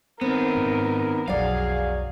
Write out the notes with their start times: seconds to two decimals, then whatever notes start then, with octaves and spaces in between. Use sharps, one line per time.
0.21 D#3 B3 C4 A#4
0.55 G#2
1.28 B1 F2 F#3 F#4 G#4 D5 F5